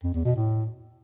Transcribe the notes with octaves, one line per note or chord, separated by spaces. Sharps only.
F2
E2
B2
A2